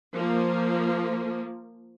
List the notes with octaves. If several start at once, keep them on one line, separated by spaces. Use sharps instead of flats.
F3 A#3